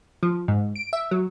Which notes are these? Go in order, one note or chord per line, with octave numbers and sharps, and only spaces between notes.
F3
G#2
D7
E5
F#3